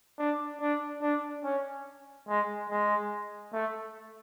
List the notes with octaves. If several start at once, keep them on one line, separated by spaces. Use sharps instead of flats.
D4
D4
D4
C#4
G#3
G#3
A3